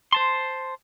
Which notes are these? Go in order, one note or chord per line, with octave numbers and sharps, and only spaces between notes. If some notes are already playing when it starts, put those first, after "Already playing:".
C5 A5 C6